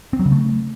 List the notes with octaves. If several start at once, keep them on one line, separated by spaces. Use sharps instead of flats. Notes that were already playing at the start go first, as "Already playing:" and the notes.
C4
F#3
C#3
A3